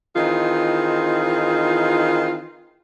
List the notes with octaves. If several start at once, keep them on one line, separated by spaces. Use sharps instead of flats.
D#3 E3 C4 D#4 F4 G#4